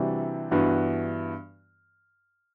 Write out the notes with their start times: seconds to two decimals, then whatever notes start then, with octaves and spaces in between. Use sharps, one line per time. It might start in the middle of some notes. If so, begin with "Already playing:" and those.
Already playing: C3 E3 G3 D4 F#4
0.51 G2 E3 B3 F#4